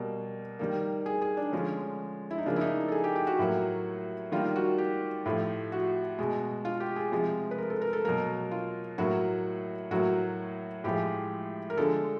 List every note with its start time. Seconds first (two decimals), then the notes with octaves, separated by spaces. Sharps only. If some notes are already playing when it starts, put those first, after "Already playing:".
Already playing: B2 G3 A#3
0.59 D#3 G3 A#3
1.06 G#4
1.22 G#4
1.37 D4
1.52 D3 F3 G#3 C#4
2.31 E4
2.38 D#4
2.46 C#3 F3 A#3 D4
2.56 E4
2.61 D#4
2.88 A4
2.92 G#4
3.04 G4
3.16 G4
3.27 F#4
3.39 A2 F#3 A#3
4.32 D#3 G3 A#3 F4
4.56 F#4
4.78 G4
5.26 A2 F3 A3
5.72 F#4
6.19 B2 G#3
6.65 F4
6.80 G4
6.96 G#4
7.11 C3 F3 G#3
7.51 B4
7.58 A#4
7.70 A4
7.81 A#4
7.93 A4
8.05 B2 F#3 A#3 A#4
8.51 F4
8.98 A2 F#3 A#3 F#4
9.91 A2 F#3 A#3 F#4
10.84 A2 F3 G#3 G4
11.70 A#4
11.77 D3 F3 G#3 A4